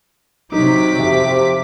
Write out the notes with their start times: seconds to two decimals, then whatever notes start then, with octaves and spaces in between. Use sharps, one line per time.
0.52 C3 F#3 D#4 D6 B6
0.99 F2 C3 E5